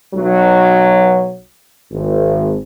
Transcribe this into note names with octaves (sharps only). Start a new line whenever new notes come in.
B1 F#3
G#1